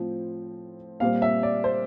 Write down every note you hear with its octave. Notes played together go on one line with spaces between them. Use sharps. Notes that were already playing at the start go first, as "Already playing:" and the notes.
Already playing: A2 F3 C4
A#2 G3 C4 F5
E5
D5
C5